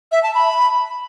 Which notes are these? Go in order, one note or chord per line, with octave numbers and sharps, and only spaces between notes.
E5
A5
B5